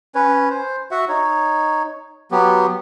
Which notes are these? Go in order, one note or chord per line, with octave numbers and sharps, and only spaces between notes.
C#4 B4 C#5
C5
F#4 E5 F#5
D#4 C#5
F#3 B3 G4